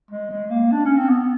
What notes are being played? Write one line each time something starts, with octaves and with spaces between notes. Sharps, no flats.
G#3
G#3
A#3
D4
C#4
C4
B3